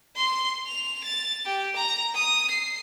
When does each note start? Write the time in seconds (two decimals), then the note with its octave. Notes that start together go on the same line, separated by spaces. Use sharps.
0.16 C6
0.67 F7
1.04 A6
1.45 G4
1.76 A#5
2.15 D#6
2.50 C7